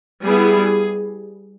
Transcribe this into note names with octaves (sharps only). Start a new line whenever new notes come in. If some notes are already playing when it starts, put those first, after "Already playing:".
G3 B3 E4 G#4